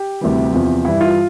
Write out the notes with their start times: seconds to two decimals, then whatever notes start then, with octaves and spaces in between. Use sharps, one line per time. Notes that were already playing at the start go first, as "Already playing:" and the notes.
Already playing: G4
0.21 D2 C3 E3 G3
0.52 E2 C3 F3
0.85 G2 E3 G3 E4
1.01 F4